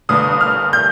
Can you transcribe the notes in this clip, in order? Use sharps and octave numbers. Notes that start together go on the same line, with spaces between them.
G1 G2 D3 D#6
F6
G6